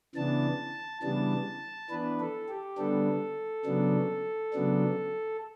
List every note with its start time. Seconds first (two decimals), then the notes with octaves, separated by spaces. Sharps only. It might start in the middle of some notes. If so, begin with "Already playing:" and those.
0.15 C#3 E3 B3 D4 A5
1.02 C#3 E3 G3 B3 D4 A5
1.90 E3 B3 D4 B4
2.20 A4
2.49 G4
2.78 D3 G3 B3 D4 A4
3.66 C#3 F#3 B3 D4
4.53 C#3 F#3 B3 D4